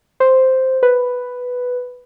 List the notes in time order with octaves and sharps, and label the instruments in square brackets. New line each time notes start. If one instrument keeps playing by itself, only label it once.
[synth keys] C5
B4